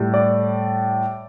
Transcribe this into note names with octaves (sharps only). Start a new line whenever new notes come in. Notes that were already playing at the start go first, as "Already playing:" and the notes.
Already playing: A2 G3
D5